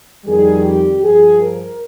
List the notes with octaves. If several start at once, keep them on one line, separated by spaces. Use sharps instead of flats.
F2 D#3 G3 G#4
G4
G2 F3 G#4
A#4